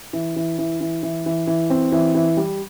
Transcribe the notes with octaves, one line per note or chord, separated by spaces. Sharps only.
E3
E3
E3
E3
E3
E3
E3
C4
E3
E3
G3